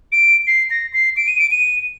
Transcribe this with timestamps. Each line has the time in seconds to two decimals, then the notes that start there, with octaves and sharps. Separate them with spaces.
0.12 D7
0.47 C7
0.71 A#6
0.94 C7
1.17 D7
1.28 D#7
1.39 D7
1.51 D#7